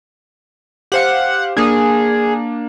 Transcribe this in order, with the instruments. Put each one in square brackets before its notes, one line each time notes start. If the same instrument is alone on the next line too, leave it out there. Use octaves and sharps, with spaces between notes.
[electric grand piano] G4 C5 F5 [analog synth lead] F#5
[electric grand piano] A#3 D4 [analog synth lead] G#4